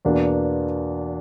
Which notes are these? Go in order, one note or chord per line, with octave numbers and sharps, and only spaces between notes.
E2 B2 A#3 D4